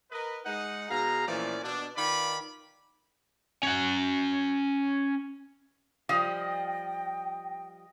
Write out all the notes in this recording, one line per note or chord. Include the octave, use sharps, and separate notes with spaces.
A#4 B4 D#5
G#3 D#4 F#5
B2 G#4 F5 A#5
A#2 E3 F3 A3 C#4 D5
B2 D4
D#3 D#4 F4 B4 D5 B5
C#4 F#5
F3 G3 D#5 F5 G5 D#6